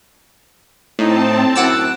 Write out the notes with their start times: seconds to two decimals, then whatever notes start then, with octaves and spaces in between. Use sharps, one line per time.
0.99 A2 C4 D#4 A5
1.56 F#2 E4 F#5 D6 E6